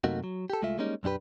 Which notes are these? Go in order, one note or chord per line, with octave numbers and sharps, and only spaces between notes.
F#2 C3 A3 A#3 D#4 F#4
F#3
G4 A4
C2 G#3 A3 F4 E5
G3 G#3 A#3 C#4 D#4
B1 F#2 D4 G4 B4